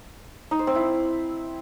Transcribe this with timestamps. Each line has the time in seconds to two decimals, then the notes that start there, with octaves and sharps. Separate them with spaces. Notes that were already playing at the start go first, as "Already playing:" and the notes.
0.51 D#4
0.59 C5
0.67 C4
0.75 E4